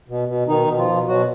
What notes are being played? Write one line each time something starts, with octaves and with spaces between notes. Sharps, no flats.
B2
B2
B2 D#3 D#4
B2
F3 F4
B2
B2 F#3 F#4